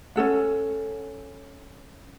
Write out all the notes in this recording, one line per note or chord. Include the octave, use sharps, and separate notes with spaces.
C#4 D#4 A4 F#5